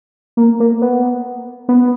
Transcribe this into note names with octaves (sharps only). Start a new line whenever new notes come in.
A#3
A#3
B3
B3